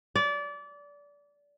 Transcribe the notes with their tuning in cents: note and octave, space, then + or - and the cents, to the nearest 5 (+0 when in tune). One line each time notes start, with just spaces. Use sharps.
D5 -25